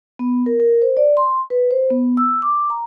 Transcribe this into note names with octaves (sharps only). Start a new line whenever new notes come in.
B3
A#4
A#4
C5
D5
C6
B4
C5
B3
E6
D6
A#5